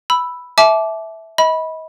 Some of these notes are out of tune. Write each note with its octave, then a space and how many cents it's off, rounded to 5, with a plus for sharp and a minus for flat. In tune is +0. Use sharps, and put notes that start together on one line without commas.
B5 +0 E6 +0
E5 -10 A5 -35 D6 -10
D#5 +35 B5 -10